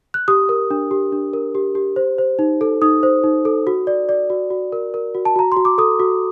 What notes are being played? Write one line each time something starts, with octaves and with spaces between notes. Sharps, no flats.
F#6
G4 D#6
A#4
D4
G4
D4
A#4
G4
G4
C5
C5
D#4
A4
D#4 D#6
C5
D#4
A4
F#4
D5
D5
F#4
F#4
A#4
A#4
F#4
A5
F#4 A#5
C6
F#4
D6
A4 D#6
F#4